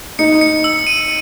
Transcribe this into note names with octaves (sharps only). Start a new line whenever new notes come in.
D#4 C#7
C#7
E6
D#7